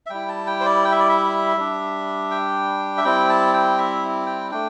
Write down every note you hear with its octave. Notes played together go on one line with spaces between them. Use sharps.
E5
G3 E4 G5
A5
G5
C5
D5
G5
E5
D5
E5
G3 D4
G5
E5
G3 C4 E4 G5
A5
G5
E5
G5
A3 D4 G5